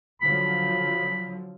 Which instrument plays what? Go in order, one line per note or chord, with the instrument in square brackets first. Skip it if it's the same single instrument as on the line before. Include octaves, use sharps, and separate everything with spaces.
[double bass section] D3 F3 F#3 [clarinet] B5